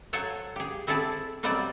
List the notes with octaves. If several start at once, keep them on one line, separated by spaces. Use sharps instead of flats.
F#3 A4 C5 C#5
G4 G#4
C4 E4 G#4 A4 D5 A5
B2 F#3 G3 C4 C5 D5